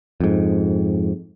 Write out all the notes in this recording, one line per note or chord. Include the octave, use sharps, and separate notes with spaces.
F2 G#2